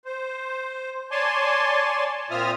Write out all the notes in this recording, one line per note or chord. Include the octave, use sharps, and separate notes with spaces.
C5
C#5 D5 G#5 A5 C6
A#2 C4 F4 E5 D#6 F6